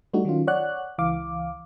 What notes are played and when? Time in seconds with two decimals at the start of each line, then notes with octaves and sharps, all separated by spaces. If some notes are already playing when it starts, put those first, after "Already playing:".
0.14 G3 A3 D4 D#4 F#4
0.25 D#3 F#3 C#4 F4
0.47 C#5 D5 F#5 F#6
0.98 C#2 E3 F5 D6